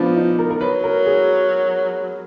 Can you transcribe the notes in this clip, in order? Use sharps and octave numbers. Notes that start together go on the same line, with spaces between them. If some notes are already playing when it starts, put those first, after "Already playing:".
Already playing: F3 B3 D4
D#4
A#4
A#4
F#3 B4
A#4
G#4